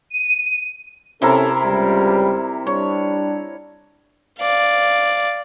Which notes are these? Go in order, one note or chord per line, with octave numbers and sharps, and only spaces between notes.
D#7
C3 C#4 E4 G4 A4 A#4
C#2 G3
G3 D4 C#5
D5 F5